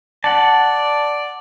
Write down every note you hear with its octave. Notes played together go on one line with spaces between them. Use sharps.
D5 F#5 A5